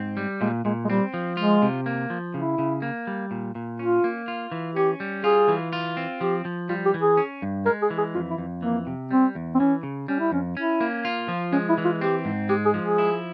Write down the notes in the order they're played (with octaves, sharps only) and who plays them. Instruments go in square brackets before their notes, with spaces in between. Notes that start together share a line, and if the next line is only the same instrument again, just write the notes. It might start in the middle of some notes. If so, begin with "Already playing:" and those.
Already playing: [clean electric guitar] G#2 C4
G3
[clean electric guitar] A#2 [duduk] G#3
[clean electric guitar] A#2 [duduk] G#3
[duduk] G#3
[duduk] G3 [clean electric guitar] C4
[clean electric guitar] F3
[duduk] G#3 [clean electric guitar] F4
[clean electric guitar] C3
A#3
F3
[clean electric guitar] C#3 [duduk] E4
[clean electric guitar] C#3
A#3
G3
A#2
A#2
[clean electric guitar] C#4 [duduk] F4
[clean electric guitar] A#3
F4
E3
[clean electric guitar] C#4 [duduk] G4
[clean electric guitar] G3
[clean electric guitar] F4 [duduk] G#4
[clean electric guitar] E3
F4
C4
[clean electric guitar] F3 [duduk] G4
[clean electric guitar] F3
[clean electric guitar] G3 [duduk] F4
[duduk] G4
[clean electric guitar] E3
[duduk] G#4
[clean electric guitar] C#4
G2
[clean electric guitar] G#3 [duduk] A#4
[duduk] G#4
[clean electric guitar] E3
[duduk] G#4
[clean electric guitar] F2 [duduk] F4
[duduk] E4
[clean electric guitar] F2
[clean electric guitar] E3 [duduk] A#3
[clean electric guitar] C3
[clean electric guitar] G3 [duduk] C4
[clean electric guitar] E2
[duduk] C4
[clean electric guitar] E3 [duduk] C#4
[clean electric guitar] C#3
[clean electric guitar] G3 [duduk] C#4
[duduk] E4
[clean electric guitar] F2 [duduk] C#4
[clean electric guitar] C#4 [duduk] E4
[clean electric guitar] A#3
F4
F3
[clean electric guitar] G#3 [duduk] C#4
[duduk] E4
[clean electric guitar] E3
[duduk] F4
[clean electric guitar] C4 [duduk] G4
[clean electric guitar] G#2
[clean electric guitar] G#3 [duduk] G4
[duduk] G#4
[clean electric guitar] F3
[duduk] G#4
[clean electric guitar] E4